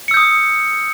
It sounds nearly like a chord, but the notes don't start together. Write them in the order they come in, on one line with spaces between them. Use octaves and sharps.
C#7 E6 G6 D#6